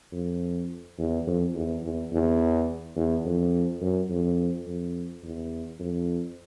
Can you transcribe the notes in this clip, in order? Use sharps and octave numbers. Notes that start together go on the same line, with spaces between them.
F2
E2
F2
E2
E2
E2
E2
F2
F#2
F2
F2
E2
F2